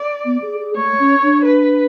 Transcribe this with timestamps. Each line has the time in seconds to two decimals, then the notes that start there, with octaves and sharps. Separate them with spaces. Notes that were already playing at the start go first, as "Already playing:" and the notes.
Already playing: D5
0.25 B3
0.42 G#4
0.60 G#4
0.76 A3 C#5
0.99 C#4
1.23 D4
1.46 B4